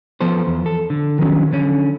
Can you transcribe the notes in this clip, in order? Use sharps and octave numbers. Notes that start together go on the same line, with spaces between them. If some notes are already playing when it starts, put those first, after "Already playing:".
F3 B3 A4 C5
E2
A4
D3
D#3 F3 F#3 C#4
D3 C#4